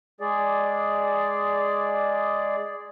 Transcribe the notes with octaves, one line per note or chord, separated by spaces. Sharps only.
G#3 G#4 D5